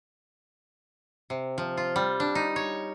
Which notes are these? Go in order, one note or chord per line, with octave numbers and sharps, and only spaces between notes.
C3
F3
F4
G3
D4
D#4
C#5